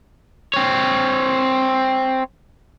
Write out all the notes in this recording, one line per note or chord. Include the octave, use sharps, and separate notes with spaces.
C4 C#5